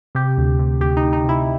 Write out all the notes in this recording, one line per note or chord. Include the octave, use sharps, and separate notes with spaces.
C3 G4
D2
C3
D2 G4
D#4
D2
D#4
C3 E4